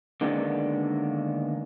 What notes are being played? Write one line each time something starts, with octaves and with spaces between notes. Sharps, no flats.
D3 D#3 G#3 A#3 B3 D4